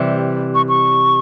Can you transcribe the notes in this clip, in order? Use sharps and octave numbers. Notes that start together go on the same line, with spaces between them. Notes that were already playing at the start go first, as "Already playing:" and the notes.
Already playing: C3 E3 G3
C#6
C#6